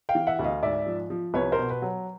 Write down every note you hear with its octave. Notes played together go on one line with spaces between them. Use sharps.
F5 G5
E3
E5 F#5
D2
D#5 F5
G#2 D5 E5
F3
F3
C2 B4 C#5
A#4 C5
B2
B4
F#3